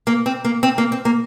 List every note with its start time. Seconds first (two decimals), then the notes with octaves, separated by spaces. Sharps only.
0.07 A#3
0.26 C4
0.45 A#3
0.63 C4
0.78 A#3
0.92 C4
1.05 A#3